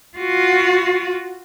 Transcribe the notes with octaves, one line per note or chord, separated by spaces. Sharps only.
F4 F#4